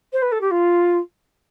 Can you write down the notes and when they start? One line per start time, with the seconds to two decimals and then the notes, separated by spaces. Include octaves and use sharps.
0.12 C5
0.22 B4
0.32 A4
0.41 G4
0.51 F4